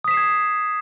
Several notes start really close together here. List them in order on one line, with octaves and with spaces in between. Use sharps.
D#6 B6 E7 C7 G#6